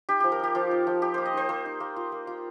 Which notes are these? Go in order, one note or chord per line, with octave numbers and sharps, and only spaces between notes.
D#4 G4
F3 G4
A#4
D#4 G4
F3 F4
D#4
F3
D#4 G4
A#3 C5
D#5
D#4 C5
A#3 C5
D#4
A#3
F4
A#3
F4